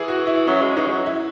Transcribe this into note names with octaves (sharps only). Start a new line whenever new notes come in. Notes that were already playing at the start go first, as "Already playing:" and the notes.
Already playing: E3 G#4
F#4
E4
F#3 C#4
G#3
E3 D#4
G#3
F#3
E4